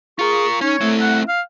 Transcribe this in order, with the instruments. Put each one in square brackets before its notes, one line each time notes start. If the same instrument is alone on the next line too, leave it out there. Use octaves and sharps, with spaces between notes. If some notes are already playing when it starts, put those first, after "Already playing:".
[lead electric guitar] F4 A#4 [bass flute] G#4 [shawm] C#6
[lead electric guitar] C#4 [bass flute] D#4 [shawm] C#5
[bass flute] A3 [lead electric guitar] C4 E4
[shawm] F#5
F5